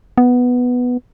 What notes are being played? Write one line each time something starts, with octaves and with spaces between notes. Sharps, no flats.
B3